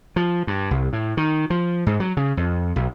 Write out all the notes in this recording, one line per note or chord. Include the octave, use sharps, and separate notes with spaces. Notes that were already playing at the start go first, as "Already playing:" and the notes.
F3
G2
C2
A2
D#3
F3
G#2
F#3
C#3
F2
B1